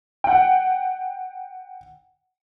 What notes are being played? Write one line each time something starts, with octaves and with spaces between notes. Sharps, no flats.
F#5 G5